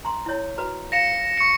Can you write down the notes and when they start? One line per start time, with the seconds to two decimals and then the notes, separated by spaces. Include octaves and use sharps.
0.05 A#5 C6
0.26 E4 C#5
0.58 F#4 B4 A#5
0.92 F5 A#6 C#7 E7
1.38 C#6 C#7